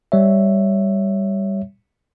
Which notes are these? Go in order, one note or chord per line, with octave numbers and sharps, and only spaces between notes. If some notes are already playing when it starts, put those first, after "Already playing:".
G3 C#5 E5